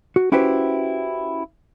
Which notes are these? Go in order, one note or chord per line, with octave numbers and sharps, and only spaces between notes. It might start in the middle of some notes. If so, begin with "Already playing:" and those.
F#4
C#4 E4 F#4 G4 B4 C5